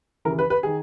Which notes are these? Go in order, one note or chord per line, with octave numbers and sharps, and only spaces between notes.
D#2 C#3 E3 A#4
B4
B4
D#3 G#4